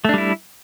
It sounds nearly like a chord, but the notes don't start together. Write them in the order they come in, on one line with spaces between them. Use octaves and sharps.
A3 D4 G3 E4